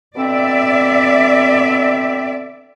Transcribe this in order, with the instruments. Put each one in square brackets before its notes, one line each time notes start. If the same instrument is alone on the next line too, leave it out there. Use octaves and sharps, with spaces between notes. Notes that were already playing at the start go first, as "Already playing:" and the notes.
[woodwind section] B2 D3 C4 [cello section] D5 E5